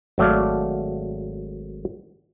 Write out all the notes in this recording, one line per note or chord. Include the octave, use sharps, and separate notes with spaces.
G#1 F#3 A3 D5 F5